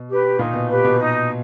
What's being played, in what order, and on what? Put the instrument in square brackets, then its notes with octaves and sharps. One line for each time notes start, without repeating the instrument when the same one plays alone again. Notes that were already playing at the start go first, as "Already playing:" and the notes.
Already playing: [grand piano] B2
[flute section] G4 B4
[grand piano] A#2 [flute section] D#4
[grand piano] B2
[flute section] G4 B4
[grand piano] B2
[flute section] D#4